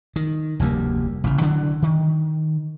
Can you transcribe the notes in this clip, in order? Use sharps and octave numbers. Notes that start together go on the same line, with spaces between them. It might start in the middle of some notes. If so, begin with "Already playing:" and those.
D#3
F1 D2 G3 A#3
A1 C#3
D3 E3 F#3 D4
D#3